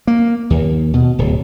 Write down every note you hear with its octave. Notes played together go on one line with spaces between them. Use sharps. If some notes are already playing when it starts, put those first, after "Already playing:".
A#3
D#2
B2
D1